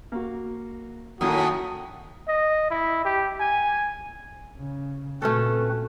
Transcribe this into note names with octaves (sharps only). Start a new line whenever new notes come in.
A#3 F#4
F#2 A2 D#3 A#3 E4 F#4 D#6
D#5
E4
G4
G#5
C#3
A#2 A3 C4 C#4 F#4 A4 B4